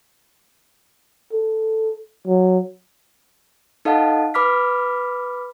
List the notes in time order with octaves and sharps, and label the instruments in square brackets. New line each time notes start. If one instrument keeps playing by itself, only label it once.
[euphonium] A4
F#3
[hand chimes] D#4 A4 D#5 F5 F#5 A5
B4 B5 D6 F6 B6